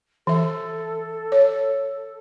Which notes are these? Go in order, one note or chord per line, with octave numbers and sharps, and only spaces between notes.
E3 A4 E5
C#5